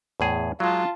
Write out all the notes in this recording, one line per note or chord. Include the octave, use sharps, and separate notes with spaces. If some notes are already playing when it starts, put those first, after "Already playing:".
E2 A2 G#4
F#3 G#3 F4 A5